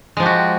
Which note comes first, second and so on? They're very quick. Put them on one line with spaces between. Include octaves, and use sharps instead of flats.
G#3 F3 G4 F#4